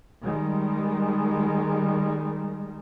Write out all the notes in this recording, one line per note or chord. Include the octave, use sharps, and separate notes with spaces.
D#3 G3 G#3